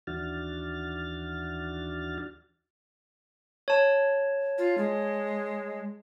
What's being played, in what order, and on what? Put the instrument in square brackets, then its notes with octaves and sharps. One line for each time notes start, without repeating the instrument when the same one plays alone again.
[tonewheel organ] D#2 E3 D4 F#4 F6 A6
[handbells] C#5 A5
[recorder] F4
G#3